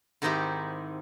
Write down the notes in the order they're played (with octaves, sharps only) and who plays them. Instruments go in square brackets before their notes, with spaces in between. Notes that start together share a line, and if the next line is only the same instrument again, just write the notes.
[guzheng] G#2 D#3 C4 D#4 E4 G4